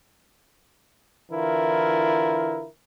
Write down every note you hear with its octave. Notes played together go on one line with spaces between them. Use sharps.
D3 E3 E4 F4 A#4